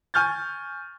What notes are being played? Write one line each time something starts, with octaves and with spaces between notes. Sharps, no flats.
G#5 C#6 F6 G6 A6